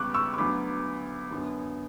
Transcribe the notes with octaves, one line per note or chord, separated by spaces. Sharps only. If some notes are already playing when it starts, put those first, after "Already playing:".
Already playing: C#2 C#3 G3 B3 C#6 D6 F#6
C#6 E6
C#6
D2 D3 F#3 B3 B5 D6
F#2 D3 F#3 B3